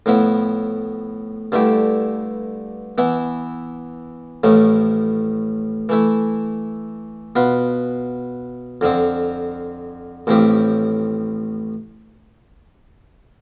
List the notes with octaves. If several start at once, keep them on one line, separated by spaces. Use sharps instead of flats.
A2 F3 B3 E4
G2 D3 A3 E4 G4
E3 B3 E4
A1 A2 F3 A3
E3 A3 E4
B2 B3 F4 B4
F2 D3 F3 C4
A1 A2 F3 C4 G4